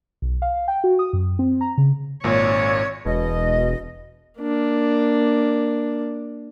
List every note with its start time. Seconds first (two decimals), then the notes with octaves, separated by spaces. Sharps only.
0.22 B1
0.42 F5
0.68 G5
0.84 F#4
0.99 D#6
1.13 F#2
1.39 C4
1.61 A#5
1.78 C#3
2.24 G#1 A#2 C#5
3.05 E1 B2 D#5
4.39 A#3 D4